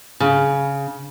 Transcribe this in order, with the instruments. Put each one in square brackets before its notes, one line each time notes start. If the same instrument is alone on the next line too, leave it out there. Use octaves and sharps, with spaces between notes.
[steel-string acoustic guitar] C#3